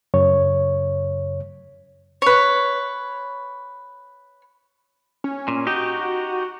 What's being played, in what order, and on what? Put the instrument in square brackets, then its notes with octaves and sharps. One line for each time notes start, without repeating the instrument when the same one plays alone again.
[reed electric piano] F#2 C#3 C#5
[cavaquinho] B4 C#5
[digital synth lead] C#4
[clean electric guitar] A#2
[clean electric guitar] D#4 G4 [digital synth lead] F#4